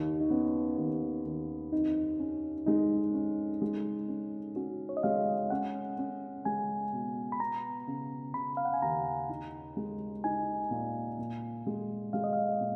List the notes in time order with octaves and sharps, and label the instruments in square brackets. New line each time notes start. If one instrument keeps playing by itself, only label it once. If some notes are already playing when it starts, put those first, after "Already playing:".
Already playing: [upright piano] D#2 [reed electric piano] D#4
[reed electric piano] D#4
[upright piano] B3 [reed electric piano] C#4
[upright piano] D#2
D#2
[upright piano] F2 [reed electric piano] D#4
[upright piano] C#4
[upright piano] G#3 [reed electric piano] D#4
[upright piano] C#4
G#3
C#4
[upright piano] C#4 [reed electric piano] F#4
[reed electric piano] C#5
D#5
[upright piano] G#3 [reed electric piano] F5
[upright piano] C#4 [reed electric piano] F#5
[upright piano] C#4
[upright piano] G#3 [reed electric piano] G#5
[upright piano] B2
[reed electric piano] B5
[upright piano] B3 [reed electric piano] A#5
[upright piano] C#3
[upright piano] C#3 [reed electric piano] B5
[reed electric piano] F5
F#5
G#5
[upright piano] D#2 [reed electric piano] A#5
[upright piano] D#4
G#3
[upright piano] D#4 [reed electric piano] G#5
[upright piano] A#2
A#2
G#3
[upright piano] G#3 [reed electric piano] F5
[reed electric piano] D#5
F5
[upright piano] A#2